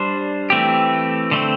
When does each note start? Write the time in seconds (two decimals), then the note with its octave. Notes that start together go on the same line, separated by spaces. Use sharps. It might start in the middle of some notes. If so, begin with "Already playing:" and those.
Already playing: G3 D4 C5
0.50 E3 A3 C4 G4
1.31 D3 A3 C4